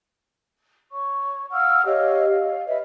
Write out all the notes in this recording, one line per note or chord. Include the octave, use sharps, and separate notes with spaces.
C#5 C#6
F5 F#5 E6 F6
G4 C#5 D#5 F5
F5
B4 D#5 E5